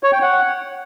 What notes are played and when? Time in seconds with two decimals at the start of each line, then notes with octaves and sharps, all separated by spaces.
0.03 C#5
0.13 G5
0.22 F#5